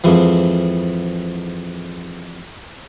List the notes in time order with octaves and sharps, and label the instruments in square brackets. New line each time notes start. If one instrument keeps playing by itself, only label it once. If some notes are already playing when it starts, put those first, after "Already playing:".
[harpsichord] F2 G#2 E3 F3